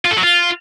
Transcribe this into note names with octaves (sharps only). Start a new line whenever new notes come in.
F4
A4
F#3
F4